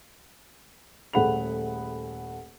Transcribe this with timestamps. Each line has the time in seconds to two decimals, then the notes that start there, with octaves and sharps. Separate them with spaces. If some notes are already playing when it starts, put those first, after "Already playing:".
1.13 D#1 A3 G#4 F#5 B5 F7